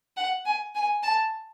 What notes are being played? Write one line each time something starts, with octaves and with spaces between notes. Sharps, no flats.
F#5
G#5
G#5
A5